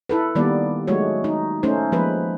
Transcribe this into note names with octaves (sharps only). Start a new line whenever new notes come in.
E4 A4 B4
D#3 G3 A#3 B3 D5
F#3 G#3 A3 F#4 C#5
D#4
A3 C#4 D#4 C5
F3 G#3 A#3 B4